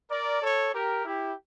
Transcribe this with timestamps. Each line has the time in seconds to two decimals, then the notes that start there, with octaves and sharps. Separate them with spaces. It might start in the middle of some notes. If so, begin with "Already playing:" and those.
0.10 A#4 D5
0.42 A4 C#5
0.73 G4 A#4
1.05 E4 G4